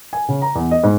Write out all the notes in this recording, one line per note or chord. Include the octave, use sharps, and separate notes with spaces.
G#5
C#3
A#5
E2
D#5
G#2